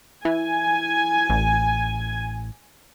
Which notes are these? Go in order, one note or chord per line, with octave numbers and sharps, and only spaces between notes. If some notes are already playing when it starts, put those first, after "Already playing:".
E3 G#5
A1